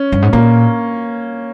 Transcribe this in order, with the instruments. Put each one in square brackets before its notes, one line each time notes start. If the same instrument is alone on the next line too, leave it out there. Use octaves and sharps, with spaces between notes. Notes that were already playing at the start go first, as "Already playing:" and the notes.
Already playing: [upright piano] C#4
[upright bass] G2
G#2
[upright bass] A#2 [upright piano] A#3